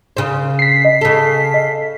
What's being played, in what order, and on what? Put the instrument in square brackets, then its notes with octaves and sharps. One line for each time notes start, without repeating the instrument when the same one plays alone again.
[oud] C#3 C5
[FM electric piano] B6 C7
[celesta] D#5
[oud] C#3 A4
[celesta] D#5